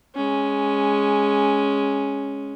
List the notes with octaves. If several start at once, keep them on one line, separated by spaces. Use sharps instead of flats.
G#3 C#4